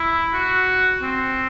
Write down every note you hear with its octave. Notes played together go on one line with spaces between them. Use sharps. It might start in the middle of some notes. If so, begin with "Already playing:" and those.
Already playing: E4
F#4
C4